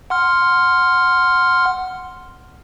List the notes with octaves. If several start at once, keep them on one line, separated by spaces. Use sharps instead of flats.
F#5 C6 F6